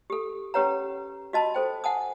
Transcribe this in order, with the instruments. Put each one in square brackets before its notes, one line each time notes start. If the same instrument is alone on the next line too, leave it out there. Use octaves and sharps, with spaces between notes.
[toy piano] G4 A4
C#4 G4 B4 C#5 F#5 A#5
F#4 D#5 A5 B5
A4 C5 G5
F#5 G#5 A5 D#6